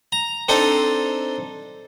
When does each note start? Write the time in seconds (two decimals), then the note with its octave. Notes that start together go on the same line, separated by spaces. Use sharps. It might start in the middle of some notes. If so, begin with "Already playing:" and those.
0.12 A#5
0.49 C4 D4 D#4 A4 C5